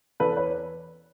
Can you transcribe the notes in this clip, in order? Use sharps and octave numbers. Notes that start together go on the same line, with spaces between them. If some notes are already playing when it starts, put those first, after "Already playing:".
E2 A4 B4
B4 C#5